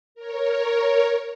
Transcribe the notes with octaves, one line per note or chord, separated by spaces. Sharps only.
A#4 C#5